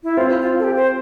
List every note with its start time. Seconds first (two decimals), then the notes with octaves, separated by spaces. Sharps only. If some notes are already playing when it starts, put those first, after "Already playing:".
0.04 E4
0.17 C4 F4
0.41 F4
0.59 A4
0.64 G4
0.76 C5